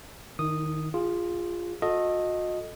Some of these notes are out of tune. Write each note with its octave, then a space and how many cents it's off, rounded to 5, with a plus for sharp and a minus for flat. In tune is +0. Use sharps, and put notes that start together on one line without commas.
D#3 -10 E4 -45 D#6 -5
F4 +0 G#4 -30
F#4 -45 A4 +0 D#5 +0